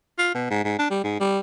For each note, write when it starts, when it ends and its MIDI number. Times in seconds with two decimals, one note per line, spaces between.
0.19 0.33 65
0.35 0.46 47
0.50 0.62 44
0.64 0.78 44
0.79 0.89 62
0.91 1.00 55
1.04 1.19 44
1.20 1.40 55